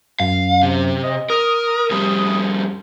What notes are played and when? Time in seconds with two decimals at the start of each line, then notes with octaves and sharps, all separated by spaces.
0.20 F#2 F5
0.63 C3
1.03 D#5
1.30 A#4 D#6
1.91 F2 G3